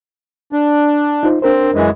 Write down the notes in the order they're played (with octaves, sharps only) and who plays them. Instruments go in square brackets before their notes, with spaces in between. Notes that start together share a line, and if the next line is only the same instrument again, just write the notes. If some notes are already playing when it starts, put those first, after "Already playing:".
[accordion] D4
[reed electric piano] D#4 F4 C5
[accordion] C4 [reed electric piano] D4 A#4 C5
[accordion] F#2 E3 G#3